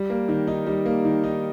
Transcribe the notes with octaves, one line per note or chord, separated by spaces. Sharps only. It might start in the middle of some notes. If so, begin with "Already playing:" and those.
Already playing: G3
A#3
D#3
D#4
G3
A#3
D#3
D#4